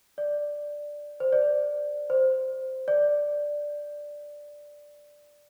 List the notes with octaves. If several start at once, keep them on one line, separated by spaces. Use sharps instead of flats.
D5
C5
D5
C5
D5